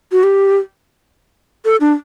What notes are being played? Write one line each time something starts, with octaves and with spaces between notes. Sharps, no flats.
F#4
G4
A4
D4